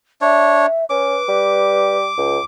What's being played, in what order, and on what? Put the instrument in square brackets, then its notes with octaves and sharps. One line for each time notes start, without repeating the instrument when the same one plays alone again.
[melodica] D4 C#5 [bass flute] E5
[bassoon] C#4 [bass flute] B4 [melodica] D6
[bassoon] G3
C#2